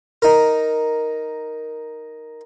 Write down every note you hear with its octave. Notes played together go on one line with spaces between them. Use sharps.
D#4 A#4